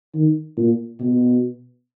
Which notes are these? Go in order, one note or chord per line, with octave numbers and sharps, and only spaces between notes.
D#3
A#2
B2